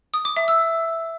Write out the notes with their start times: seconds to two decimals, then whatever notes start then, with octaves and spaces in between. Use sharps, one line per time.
0.14 D#6
0.25 D6
0.37 E5
0.48 E6